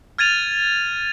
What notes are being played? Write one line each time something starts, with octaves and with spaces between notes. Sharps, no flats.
F6 G#6 A6 D#7 F7